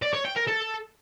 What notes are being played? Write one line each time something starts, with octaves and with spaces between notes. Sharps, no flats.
D5
C#5
G5
A#4
A4